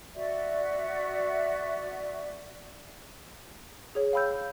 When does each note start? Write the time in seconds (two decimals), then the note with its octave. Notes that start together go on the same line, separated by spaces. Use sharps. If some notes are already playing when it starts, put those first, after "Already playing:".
0.16 F#4 D5 E5
3.95 G#4 C#5
4.13 F5 G5 B5 E6 G6